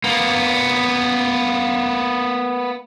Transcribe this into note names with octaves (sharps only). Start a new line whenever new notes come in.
A#3 B3